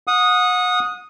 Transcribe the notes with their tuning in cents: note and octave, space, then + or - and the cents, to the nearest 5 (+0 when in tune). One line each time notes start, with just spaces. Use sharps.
F#5 -30 D#6 +0